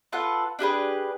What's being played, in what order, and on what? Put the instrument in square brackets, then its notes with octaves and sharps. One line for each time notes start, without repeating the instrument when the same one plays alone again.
[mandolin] F4 A4 B4 F#5
D4 G4 G#4 B4